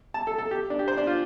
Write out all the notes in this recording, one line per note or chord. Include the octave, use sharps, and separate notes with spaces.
A5
A4
A4
G4
D4
G4
C5
D4
F4